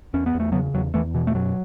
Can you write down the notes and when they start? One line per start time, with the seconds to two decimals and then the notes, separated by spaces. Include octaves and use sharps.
0.14 E2 C#4
0.26 B3
0.34 E2
0.40 A3
0.52 C#3 F#3 B3
0.74 E2 F#3
0.94 E2 E3 A3
1.14 B2 E3
1.27 A3
1.35 F#2 F#3